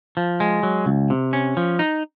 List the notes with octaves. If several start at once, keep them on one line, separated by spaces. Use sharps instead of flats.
F3
G#3
F#3
C#2
C3
C#4
F3
D#4